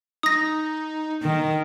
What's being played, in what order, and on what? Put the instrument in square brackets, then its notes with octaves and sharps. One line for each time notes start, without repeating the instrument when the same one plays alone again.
[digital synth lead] D#4 [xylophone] D#6 A#6
[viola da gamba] D#3